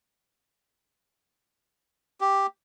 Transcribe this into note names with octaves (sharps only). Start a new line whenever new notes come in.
G4